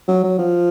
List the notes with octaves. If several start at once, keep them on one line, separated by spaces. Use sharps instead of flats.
F#3
F#3
F3